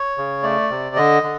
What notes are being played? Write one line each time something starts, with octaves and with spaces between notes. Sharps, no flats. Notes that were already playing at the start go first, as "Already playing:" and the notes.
Already playing: C#5
C#3
A3 D5
C3
D3 D#5
D3